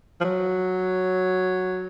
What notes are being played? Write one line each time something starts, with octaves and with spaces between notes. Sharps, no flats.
F3
F#3